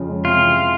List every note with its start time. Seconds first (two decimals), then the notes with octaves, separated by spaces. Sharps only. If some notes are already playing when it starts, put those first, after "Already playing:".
Already playing: F2 C#3 F3
0.08 G#3
0.24 C3 F4
0.40 E3